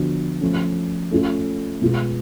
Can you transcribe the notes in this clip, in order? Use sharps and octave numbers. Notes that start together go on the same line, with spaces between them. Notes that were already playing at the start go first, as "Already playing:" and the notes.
Already playing: D3 F3 B3 D4 F#4
F3 A3 C#4
A3 C#4 F4 A4
B2 G#3 B3 F4